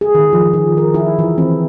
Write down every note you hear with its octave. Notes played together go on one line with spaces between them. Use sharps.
G#4
D#3
F3
D#3
A#4
E4
E3
C4